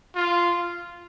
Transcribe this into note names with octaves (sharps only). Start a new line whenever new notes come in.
F4